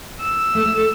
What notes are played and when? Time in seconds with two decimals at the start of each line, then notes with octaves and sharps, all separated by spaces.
0.21 E6
0.55 A3
0.65 A3
0.77 A3